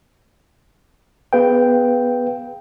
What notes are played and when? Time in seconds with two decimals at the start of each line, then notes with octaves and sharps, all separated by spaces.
1.33 B3 G#4 B4 F5 G5